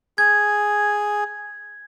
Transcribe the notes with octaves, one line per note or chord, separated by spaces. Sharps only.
G#4 G#6